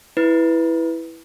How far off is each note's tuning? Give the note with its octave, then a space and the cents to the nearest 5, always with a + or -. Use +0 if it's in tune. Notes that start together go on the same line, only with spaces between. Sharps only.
E4 +0 B4 +0